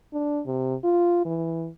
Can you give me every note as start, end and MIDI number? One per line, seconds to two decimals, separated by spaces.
0.14 0.41 62
0.47 0.75 48
0.84 1.25 65
1.26 1.69 52